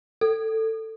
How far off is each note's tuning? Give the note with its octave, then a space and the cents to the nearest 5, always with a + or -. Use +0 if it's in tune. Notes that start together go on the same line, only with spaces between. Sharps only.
A4 +15